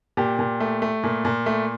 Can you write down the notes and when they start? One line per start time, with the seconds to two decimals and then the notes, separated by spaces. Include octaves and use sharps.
0.17 A#2 G4
0.39 A#2
0.60 A3
0.82 A3
1.04 A#2
1.25 A#2
1.46 A3